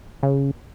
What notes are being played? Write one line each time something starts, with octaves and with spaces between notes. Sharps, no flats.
C#3